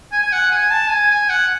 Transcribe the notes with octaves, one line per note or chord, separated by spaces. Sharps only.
G#5
G#5
F#5
G#5
A5
G#5
G#5
F#5